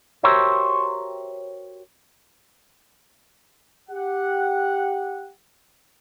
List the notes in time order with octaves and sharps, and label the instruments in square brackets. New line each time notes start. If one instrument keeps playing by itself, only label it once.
[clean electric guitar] F#4 G4 A#4 C5 C#5 E5
[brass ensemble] G4 F#5